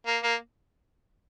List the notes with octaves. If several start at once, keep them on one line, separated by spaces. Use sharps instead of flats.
A#3
A#3